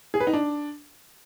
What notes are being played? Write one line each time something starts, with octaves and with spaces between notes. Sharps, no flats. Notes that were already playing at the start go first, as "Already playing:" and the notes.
G#4
B4
D#4
D4